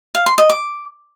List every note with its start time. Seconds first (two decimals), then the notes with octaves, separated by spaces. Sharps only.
0.15 F5
0.26 C6
0.38 D#5
0.50 D6